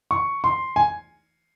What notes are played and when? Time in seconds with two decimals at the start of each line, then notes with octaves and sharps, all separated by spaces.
0.11 C#6
0.44 C6
0.76 G#5